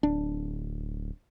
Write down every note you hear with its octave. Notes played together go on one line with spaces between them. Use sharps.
D1 D4